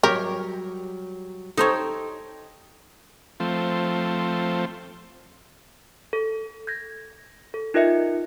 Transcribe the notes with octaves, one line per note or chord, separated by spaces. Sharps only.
F#3 G3 G4 A#4 C#5
D#4 G4 A4 C5 C#5
F3 A3 C4
A4
G6 G#6 A#6
A4
D#4 F4 A#4 D#5 E5 C#7